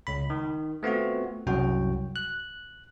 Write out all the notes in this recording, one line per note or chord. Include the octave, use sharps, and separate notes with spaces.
C#2 B5
D#3
A3 B3 C4 F4 F#4
C2 F#2 F#3 F#4 G5
F#6